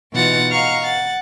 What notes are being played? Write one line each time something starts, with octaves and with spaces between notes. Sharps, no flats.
B2 E3 D#4 F4 F#5 A6
D#5 F5 F#5 A#5 C#6 F6
F#5 A6